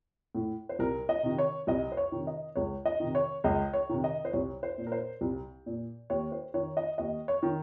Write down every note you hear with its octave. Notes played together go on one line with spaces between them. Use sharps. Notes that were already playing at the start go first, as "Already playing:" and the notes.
A2
C5
C2 A#4
D#5
C3 D#3
C#5
C2 D#5
C5
C#5
C3 D#3
D#5
C#2 C#5
D#5
C3 D#3
C#5
C#2 D#5
C#5
C3 D#3
D#5
C5
C2 C#5
C5
A#2
A#4
C5
C2
A#2
D#2 C#5
C5
D#3 C#5
D#5
D#2 D#5
C#5
D#3